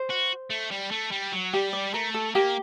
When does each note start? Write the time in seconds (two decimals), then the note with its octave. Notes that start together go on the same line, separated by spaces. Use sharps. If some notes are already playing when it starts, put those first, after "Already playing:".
Already playing: C5
0.10 F#4
0.50 A3
0.71 G3
0.91 A3
1.12 G3
1.32 F#3
1.53 G3 G4
1.73 D5
1.94 A3 A#4
2.14 A4
2.35 A#3 G4